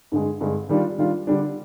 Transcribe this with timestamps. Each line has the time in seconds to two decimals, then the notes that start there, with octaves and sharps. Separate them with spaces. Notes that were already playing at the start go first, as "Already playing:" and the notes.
0.12 G2 D3 G#3
0.41 G2 D3 G#3
0.69 D#3 G3 D4 F4
0.98 D#3 G3 D4 F4
1.27 D3 G3 D4